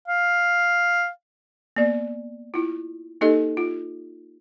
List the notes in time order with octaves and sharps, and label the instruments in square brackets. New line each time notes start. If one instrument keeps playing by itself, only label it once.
[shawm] F5
[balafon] A#3 B3 D5
E4 F4
A#3 D#4 G4 A4 D#5
F4